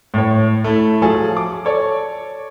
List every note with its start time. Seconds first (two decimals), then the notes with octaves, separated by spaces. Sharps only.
0.14 A2 C#5
0.64 A3 E4
1.02 F3 F#3 G#4 A4
1.37 D6
1.65 A4 C#5 D5